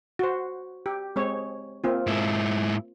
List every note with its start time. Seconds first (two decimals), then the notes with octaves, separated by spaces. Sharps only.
0.19 F#4 C5
0.86 G4
1.16 G#3 C4 C#5
1.84 A#3 C4 F4
2.07 G#2 E4